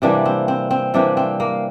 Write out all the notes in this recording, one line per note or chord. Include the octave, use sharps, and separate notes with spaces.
C3 E3 G3 A#3 D4
C4
C4
C4
C3 E3 G3 A#3 D4
C4
A#3